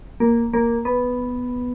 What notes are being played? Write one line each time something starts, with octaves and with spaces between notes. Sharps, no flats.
A#3
A#3
B3